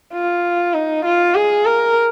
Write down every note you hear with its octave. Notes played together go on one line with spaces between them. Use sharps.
F4
D#4
F4
G#4
A#4